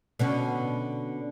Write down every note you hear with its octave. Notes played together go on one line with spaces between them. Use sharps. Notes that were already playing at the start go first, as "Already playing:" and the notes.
B2 D3 C#4